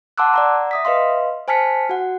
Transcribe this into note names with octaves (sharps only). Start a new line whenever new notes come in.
F#5 A5 C6 D6 E6 F#6
D5 F#5 A#5
E5 D#6 B6
B4 D#5 F5 C6
C5 G#5 A5 F6 B6 C#7
F#4 F#5